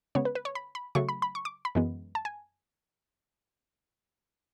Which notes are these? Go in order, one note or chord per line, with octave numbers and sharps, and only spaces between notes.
C#3 G#3 B3 C#5
B4
B4
C#5
B5
B5
C#3 F#3 A3 C#6
B5
B5
C#6
D6
B5
F#2 E3 G#3 B3
A5
G#5